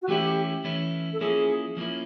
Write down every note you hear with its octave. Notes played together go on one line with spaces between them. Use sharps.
F#4
E3 A3 C#4 E4 G4
E3 A3 C#4 E4
A4
F3 A#3 C#4 E4 G#4
F3 A#3 C#4 E4